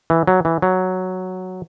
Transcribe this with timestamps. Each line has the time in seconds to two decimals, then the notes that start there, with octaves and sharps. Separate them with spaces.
0.10 E3
0.27 F#3
0.45 E3
0.62 F#3